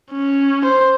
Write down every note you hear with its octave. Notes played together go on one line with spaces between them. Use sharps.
C#4
C5